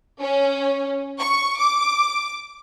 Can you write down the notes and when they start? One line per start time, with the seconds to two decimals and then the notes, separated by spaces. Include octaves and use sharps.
0.20 C#4
1.20 C#6
1.58 D6